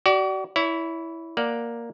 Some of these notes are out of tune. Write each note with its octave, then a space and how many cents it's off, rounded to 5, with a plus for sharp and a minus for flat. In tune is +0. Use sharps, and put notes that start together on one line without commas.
F#4 +40 D5 +0
E4 +0 C#5 +40
A#3 +0 D5 +0 F#5 +0